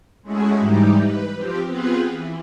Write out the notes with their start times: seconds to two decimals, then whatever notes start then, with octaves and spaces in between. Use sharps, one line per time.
0.22 G#3 A3 C#4 E4 F#4 G#4
0.59 G#2 E3 G3 D#4 G4
0.97 B4
1.35 F3 C4 G4
1.67 B3 C4 F4 G#4 B4
2.10 E3